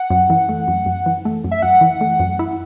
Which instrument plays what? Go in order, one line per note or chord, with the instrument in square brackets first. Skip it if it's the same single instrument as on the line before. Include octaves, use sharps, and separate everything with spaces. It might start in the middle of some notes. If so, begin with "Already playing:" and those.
Already playing: [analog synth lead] F#5
[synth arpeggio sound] F#2
E3
A3
F#2
F#2
E3
A3
F#2
[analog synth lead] E5
[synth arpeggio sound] F#2 [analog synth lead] F#5
[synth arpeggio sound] E3
A3
F#2
E4